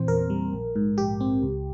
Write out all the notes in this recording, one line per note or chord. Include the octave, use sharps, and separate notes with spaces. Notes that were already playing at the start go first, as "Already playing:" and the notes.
Already playing: A#2 E3 C4 C5
E2 A#4
G3
A#1
G#2
A#1 G4
C4
C#2